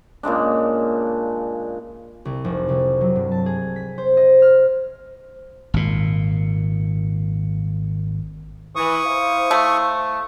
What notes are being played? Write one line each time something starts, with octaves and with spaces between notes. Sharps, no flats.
A#2 C#3 G#3 D4
C2
F1
C2
F#3
G2
A5
G#4
B6
C5
D#5
F6
G#1 A#2
E3 C#6 D#6
E4 C5 F5
A3